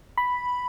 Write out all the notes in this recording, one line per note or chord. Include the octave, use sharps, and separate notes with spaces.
B5